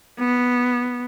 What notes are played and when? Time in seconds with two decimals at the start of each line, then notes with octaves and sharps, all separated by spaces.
0.19 B3